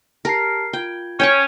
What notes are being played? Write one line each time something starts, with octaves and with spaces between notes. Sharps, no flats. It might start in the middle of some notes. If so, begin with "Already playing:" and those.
G4 A#4 A5 C7
F4 G5 G#6
C#4 G5 G#5 C#6